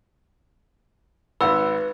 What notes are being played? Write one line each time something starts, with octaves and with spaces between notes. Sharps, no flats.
G#1 B4 F#5 B5 E6